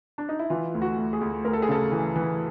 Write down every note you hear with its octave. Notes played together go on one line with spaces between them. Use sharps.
D4
D#4
E4
E3 F4
D2
F#4
D2
G#4
D2
D2 A#4
A4
G#4
C#3 A4
E3
E3